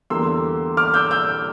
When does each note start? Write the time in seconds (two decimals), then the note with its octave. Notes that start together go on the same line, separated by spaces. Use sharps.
0.10 E2 D3 G3 A#3 C6 E6
0.77 D6 F6
0.94 E6 G6
1.11 E6 G6